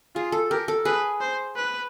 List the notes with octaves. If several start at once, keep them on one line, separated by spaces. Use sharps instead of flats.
F4 G#4
A4
G4 A#4
A4
G#4 B4
C5
B4